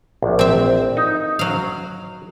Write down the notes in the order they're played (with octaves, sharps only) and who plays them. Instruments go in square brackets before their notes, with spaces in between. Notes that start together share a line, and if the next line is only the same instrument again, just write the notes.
[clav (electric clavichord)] A#1
[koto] C4 E5
[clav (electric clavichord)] D#4
[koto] F#3 F5